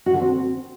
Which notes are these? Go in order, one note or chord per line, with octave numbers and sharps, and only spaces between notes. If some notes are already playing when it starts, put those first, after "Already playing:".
F#4
D3
C4